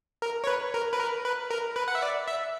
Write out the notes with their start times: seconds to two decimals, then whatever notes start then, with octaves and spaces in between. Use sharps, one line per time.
0.22 A#4
0.44 C#5
0.47 B4
0.74 A#4
0.93 B4
0.99 A#4
1.25 B4
1.51 A#4
1.76 B4
1.88 F#5
1.95 E5
2.02 D5
2.28 E5